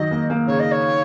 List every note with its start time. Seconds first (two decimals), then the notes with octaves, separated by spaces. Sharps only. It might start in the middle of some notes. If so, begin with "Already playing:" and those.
Already playing: D#3 F#3 D#5
0.11 A#3
0.30 A#3
0.47 C#3 C#5
0.60 D#5
0.72 C#5